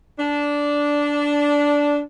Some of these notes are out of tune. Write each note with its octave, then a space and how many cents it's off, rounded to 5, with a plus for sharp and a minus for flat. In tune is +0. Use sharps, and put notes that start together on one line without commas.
D4 -10